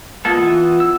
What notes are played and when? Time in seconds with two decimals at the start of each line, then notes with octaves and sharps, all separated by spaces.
0.25 G#3 A#3 B3 F4 A4
0.36 E3
0.80 E6